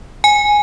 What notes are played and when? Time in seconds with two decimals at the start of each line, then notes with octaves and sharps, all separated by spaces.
0.24 G#5